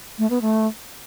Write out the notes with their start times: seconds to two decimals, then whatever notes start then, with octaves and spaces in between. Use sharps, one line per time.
0.19 A3
0.30 B3
0.42 A3